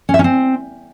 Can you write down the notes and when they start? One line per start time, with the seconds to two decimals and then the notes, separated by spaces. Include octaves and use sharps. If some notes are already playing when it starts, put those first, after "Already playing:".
0.09 C#4
0.14 E5
0.19 C#4
0.24 C4